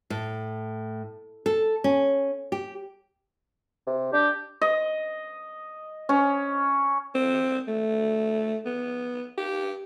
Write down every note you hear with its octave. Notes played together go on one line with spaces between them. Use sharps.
A2
A4
C#4
G4
C3
D4 G4
D#5
C#4
C4
A3
B3
G4